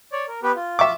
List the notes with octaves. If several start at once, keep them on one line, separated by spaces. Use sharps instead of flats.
C#5 D5
A#4
B3 G4 B4
F4
E5 C#6 D6